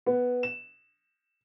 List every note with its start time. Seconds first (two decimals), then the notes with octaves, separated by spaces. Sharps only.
0.06 B3
0.43 E7